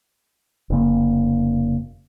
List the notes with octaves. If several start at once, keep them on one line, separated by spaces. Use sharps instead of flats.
F1 C#3 A#3